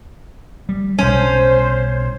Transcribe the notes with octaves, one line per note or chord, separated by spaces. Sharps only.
G3
B1 G3 C#4 C5